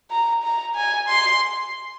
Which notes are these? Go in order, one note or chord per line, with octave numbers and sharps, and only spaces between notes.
A#5
A#5
G#5
C6